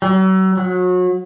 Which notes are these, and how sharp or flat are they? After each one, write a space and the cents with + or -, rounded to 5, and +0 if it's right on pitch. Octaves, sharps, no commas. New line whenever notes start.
F#3 +40
F#3 -30